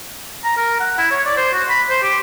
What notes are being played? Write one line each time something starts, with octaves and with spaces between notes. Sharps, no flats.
A#5
A#4
F#5
E4
C#5
D5
C5
F#4
B5
C5
G4